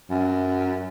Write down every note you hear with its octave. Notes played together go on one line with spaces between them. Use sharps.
F#2